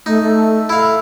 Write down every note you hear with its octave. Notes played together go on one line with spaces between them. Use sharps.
A3 D#4
A3
E4 A4 F5